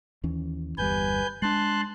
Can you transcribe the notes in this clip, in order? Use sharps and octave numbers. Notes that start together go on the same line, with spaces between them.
D#2 E3 C#4
G1 E2 G3 B4 G#5 G6
G#3 D4 A5 C6 F#6